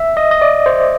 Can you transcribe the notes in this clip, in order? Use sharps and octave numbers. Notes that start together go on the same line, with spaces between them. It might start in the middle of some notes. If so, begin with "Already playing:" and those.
Already playing: E5
D#5
D#5
D5
C5